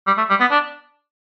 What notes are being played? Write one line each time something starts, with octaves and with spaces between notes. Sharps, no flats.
G3
A3
G3
B3
D4